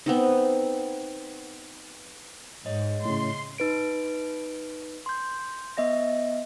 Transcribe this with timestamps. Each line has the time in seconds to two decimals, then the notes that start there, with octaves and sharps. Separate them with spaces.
0.06 B3 C4 D#4
2.66 G#2 C#5 D#5
3.05 A2 C#3 C6
3.58 D#4 B4 D7
5.06 C6 G6
5.77 B3 D#5 E5 A#6